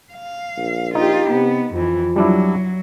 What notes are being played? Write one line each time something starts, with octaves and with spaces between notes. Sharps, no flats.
F5
A#1
D#4 F4 G4
C3 B3
F2 E3 F3
F#3 G3 D4 E4